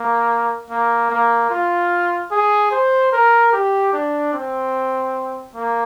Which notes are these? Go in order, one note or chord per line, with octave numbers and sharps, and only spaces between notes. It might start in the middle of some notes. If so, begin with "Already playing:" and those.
Already playing: A#3
A#3
A#3
F4
G#4
C5
A#4
G4
D4
C4
A#3